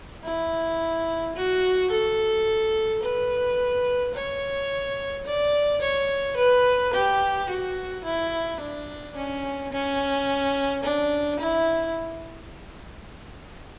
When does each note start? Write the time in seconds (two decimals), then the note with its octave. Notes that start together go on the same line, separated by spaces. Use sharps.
0.24 E4
1.36 F#4
1.91 A4
3.03 B4
4.15 C#5
5.25 D5
5.82 C#5
6.37 B4
6.93 G4
7.49 F#4
8.05 E4
8.60 D4
9.16 C#4
9.72 C#4
10.83 D4
11.39 E4